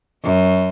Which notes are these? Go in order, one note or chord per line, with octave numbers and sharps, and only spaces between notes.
F#2